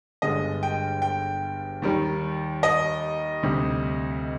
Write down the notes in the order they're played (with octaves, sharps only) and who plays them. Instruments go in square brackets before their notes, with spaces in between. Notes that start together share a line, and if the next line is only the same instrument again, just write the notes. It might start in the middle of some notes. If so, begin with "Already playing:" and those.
[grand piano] G1 G2 D3 G#3 D#5
G5
G5
D#2 D#3 G3
D#5
D2 C3 G3